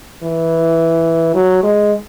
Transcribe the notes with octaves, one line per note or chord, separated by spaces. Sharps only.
E3
F#3
G#3